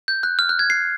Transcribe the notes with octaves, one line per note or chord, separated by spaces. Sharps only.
G6
F#6
F6
F#6
G#6
C7